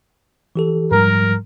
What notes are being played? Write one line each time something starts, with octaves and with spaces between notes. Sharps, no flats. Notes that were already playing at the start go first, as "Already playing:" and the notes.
E3 G4 A4
G#2 F3 G3 A#4